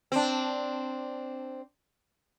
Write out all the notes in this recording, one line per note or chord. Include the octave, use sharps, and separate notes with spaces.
C4 D4